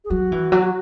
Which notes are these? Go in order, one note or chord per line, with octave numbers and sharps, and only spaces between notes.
G#4
F#3 F#4
E3
F#3